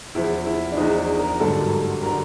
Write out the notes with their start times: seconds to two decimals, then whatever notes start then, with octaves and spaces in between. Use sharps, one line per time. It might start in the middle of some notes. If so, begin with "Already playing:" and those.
0.15 E2 C#3 F3 E4
0.46 E4
0.72 D4
0.77 E2 C#3 F3 D#4
1.19 A#4
1.40 G#1 G2 D3 F#3 A4
2.03 A#4
2.05 D3 F#3